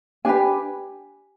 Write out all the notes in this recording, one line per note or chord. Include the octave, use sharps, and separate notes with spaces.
D4 G4 B4 G#5